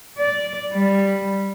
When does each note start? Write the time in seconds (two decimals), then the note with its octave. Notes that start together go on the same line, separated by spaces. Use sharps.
0.19 D5
0.73 G3